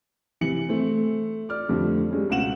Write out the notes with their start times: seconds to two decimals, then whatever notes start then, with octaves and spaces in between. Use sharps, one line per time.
0.41 C3 E3 C#7 F#7
0.69 A3 C4
1.49 D5 F6
1.69 F2 D3 G3 A3
2.11 G3 G#3 C#4
2.30 C#2 B2 F5 F#5 E7 F#7